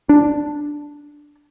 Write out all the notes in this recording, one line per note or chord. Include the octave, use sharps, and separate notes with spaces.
D4